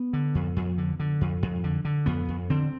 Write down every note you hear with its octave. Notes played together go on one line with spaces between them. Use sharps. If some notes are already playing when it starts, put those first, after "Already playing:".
Already playing: B3
D3
F2
F2
D3
D3
F2
F2
D3
D3
F2 B3
F2
D3 C4